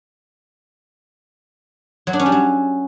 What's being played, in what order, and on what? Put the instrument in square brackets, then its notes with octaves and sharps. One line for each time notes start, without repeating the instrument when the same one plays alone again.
[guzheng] F#3
D4
C#4
G3
F#3